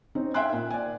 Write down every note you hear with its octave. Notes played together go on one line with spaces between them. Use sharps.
C4 C#4 D#4
E5 F5 G5 G#5 C6 F#6
A#2
D5 G#5